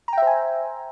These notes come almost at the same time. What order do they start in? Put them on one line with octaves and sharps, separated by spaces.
A#5 G5 E5 C5 G#5